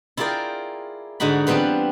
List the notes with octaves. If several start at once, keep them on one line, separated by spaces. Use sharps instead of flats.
E4 F4 G#4 A#4 D5 G5
G#2 D3 G#3 D#4 F#4 B5
E3 G3 B3 C4 D4 F4